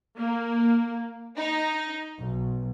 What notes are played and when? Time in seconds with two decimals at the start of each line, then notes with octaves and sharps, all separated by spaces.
0.17 A#3
1.37 D#4
2.19 B1